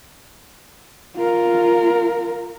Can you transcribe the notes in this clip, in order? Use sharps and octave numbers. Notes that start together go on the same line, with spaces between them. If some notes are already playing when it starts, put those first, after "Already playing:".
F4 A#4